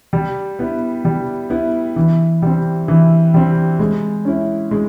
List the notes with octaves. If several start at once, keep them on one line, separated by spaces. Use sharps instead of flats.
G3
B3 E4
G3
B3 E4
E3
G3 C4
E3
G3 C4
G#3
C#4 E4
G#3